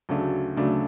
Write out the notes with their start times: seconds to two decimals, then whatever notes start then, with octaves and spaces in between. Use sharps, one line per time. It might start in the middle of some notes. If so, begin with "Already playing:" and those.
0.09 D2 C#3 F#3 A3 D4
0.57 D2 C#3 F#3 A3 D4